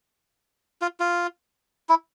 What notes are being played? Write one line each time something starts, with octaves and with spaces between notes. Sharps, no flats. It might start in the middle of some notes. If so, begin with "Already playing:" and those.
F4
F4
E4